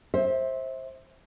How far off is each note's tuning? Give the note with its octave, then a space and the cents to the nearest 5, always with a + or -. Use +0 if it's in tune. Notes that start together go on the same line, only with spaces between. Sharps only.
C5 +20 E5 -20